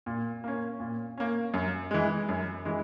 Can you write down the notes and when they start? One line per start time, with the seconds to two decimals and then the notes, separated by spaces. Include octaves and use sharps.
0.06 A#2
0.44 A#3 C#4
0.80 A#2
1.18 A#3 C#4
1.54 F#2
1.91 E3 G#3
2.29 F#2
2.65 E3 G#3